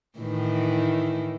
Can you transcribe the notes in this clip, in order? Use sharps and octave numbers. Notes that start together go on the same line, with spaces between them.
A2 D#3 E3